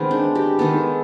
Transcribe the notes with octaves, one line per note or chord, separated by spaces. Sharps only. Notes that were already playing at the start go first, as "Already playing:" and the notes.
Already playing: D#3 G#3 B3 C4
D4
G4
D#3 G#3 B3 A4